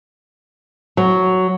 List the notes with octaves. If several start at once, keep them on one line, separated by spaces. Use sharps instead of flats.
F#3